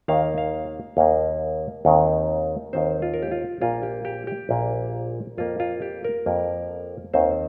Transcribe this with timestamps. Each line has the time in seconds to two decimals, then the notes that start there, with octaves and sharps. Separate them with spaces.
0.08 D#2 D#3 A#3 F5
0.38 F5
0.97 D#2 D#3 A#3
1.85 D#2 D#3 C4
2.73 D#2 D#3 C4 C5
3.02 F4
3.14 A#4
3.23 G4
3.31 F4
3.61 A#1 A#2 A#3 F4
3.83 G4
4.05 G4
4.27 G4
4.49 A#1 A#2 A#3
5.38 F2 F3 A#3 F4
5.60 F4
5.82 G4
6.04 A#4
6.26 F2 F3 A#3
7.14 D#2 D#3 C4 C5